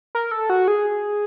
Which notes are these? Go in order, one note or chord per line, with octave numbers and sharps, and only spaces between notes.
A#4
A4
F#4
G#4